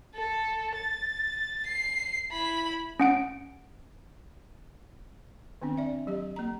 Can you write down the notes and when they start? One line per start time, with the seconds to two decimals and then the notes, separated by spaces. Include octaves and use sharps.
0.15 A4
0.75 A6
1.66 C7
2.32 E4 B5
3.00 C#4 F#5 D7
5.62 D#3 B3 C4 D4
5.77 D5 E5
6.07 F#3 G4 D#5
6.36 A#3 A#5